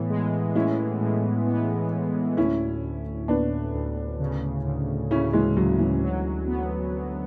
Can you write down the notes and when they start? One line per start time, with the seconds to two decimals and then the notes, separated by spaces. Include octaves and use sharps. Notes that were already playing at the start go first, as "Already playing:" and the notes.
Already playing: A2 E3 B3
0.10 G#3
0.55 G#3 C#4 E4
1.01 A2
1.47 B3
1.93 A2
2.37 D2 C#4 E4
2.84 D2
3.28 D2 B3 D4
3.74 D2
4.20 C#3
4.65 D2
5.10 C#3 C#4 E4
5.33 E3 G#3
5.56 D2 F#3
5.79 E3
6.02 F#3
6.47 B3
6.93 F#3